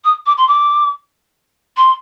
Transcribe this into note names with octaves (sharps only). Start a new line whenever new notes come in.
D#6
D6
C6
D6
C6